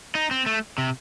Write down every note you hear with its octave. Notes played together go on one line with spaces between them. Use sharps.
D#4
C4
A3
C3